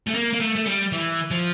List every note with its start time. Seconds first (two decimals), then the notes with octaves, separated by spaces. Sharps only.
0.07 A3
0.15 A#3
0.33 A#3
0.40 A3
0.56 A3
0.66 G3
0.92 E3
1.31 F3